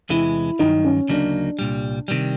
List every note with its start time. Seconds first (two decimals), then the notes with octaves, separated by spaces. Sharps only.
0.09 E2 C3 E3 G#3 E4
0.59 G2 D#3 F#3 D#4
0.84 C#4
1.09 D2 C#3 F#3 A#3 D4 D#4
1.59 C2 A#2 G3
2.08 C3 D#3 G3